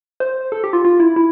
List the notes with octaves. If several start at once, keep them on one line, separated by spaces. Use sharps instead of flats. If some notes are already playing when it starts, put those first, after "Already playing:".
C5
A4
G4
F4
F4
E4
E4